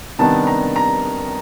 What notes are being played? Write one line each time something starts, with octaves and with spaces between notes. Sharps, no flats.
C3 D#3 G3 B3 D4 A5
A#5
A#5